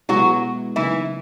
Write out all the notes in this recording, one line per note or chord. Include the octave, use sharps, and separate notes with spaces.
B2 F#3 G#3 B3 E4 F#4
C#3 E3 F#3 A#3 D#4 E4